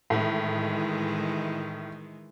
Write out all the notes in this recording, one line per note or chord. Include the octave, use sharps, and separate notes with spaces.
A2 D#3 E3 G#3